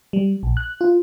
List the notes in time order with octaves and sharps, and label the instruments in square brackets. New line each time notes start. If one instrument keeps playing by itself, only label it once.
[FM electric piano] G3
A#1
F#6
F4